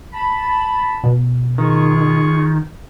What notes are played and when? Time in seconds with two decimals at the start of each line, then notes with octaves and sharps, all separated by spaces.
0.13 A5 B5
1.04 B2
1.58 D#3 F4 G#4 C#6